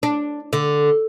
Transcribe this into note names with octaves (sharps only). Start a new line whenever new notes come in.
D4
D3